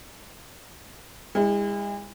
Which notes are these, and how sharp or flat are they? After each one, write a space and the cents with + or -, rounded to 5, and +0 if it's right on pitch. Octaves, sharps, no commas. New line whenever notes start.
G#3 -40 E4 -15